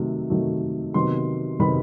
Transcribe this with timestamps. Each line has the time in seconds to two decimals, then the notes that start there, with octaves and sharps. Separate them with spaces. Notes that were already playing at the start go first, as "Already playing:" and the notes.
Already playing: C3 D#3 F#3 A3
0.30 C3 D#3 F#3 A3
0.94 C3 D#3 F#3 B3 C6
1.59 C3 D#3 F#3 B3 B5